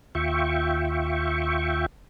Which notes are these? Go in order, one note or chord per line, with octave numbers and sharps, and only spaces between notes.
D#2 F4 E5 G5 C#6